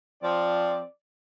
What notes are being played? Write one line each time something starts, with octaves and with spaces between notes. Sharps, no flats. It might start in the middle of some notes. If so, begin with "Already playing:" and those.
F3 C4 D5